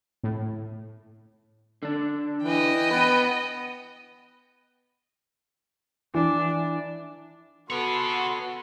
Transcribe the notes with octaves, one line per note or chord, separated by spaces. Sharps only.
A2
D3 D4
E3 D#5 G5
B3 B4
E3 D4
B3 F#4 G#4 A4 C#5 C6